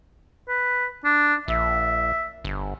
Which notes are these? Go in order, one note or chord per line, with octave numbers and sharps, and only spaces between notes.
B4
D4
A#1 E5
G1